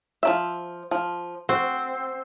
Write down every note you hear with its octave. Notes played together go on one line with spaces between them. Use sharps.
F3 F#3 E5
F3
C4 F#4